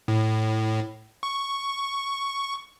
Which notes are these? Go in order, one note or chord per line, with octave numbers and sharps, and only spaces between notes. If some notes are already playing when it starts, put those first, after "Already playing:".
A2
C#6